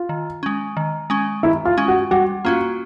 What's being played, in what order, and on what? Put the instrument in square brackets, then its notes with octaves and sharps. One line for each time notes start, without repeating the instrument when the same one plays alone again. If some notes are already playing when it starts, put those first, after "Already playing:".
Already playing: [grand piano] F4
[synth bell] D#3
G#3 C#4
D#3
G#3 C#4
[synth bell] D#3 [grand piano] E4
[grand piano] F4
[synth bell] G#3 C#4
[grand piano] F#4
[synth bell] G3 [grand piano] F#4
[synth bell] A#3 C#4 F#4 [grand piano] F4